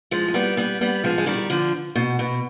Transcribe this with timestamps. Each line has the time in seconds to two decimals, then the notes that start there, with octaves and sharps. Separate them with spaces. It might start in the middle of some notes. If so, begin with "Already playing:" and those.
0.11 F3 G#3
0.28 G#3
0.34 G3 B3
0.57 G3 B3
0.81 G3 B3
1.04 F3 G#3
1.18 G#3
1.26 D#3 G3
1.50 D3 F3
1.95 B2
2.19 B2